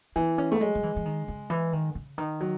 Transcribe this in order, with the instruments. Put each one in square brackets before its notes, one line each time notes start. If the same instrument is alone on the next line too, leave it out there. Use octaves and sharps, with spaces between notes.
[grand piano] E3 [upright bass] B3
[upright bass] C#4
[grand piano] A3
[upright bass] F#3 [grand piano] G#3
[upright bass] F#3
E3
E3
D#3
C#3
E3
D#3
C#3
D#3
[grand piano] F#3